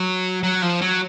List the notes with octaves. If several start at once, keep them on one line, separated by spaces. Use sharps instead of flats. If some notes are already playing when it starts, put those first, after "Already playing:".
Already playing: F#3
F#3
F3
F#3